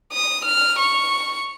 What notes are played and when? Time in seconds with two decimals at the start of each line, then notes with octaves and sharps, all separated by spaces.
0.13 D#6
0.45 F6
0.79 C#6